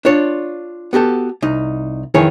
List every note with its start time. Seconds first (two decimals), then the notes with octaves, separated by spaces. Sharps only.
0.05 D4 F4 C#5
0.93 B3 F#4 G4 A4
1.42 C2 D#4
2.14 F2 D#3 E3 G#4 C#5